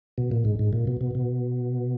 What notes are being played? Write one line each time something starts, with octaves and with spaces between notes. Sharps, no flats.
B2
A#2
G#2
G#2
A#2
B2
B2
B2